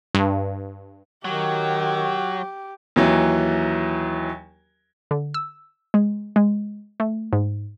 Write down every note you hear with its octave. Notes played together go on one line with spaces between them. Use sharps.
G2
D#3 F#3 G4
D#2 E3 F#3
D3
E6
G#3
G#3
A3
G#2